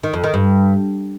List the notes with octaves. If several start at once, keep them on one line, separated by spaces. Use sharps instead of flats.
D#3
F2
D#3
G2